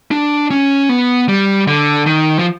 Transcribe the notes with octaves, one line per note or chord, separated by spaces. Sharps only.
D4
C#4
B3
G3
D3
D#3
F3